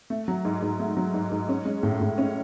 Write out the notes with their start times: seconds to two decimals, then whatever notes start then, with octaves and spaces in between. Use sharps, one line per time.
0.10 A3
0.28 F#3
0.45 G#2
0.62 G#2
0.79 A3
0.97 F#3
1.14 G#2
1.31 G#2
1.49 C#4
1.65 G#3
1.83 A2
2.01 A2
2.18 C#4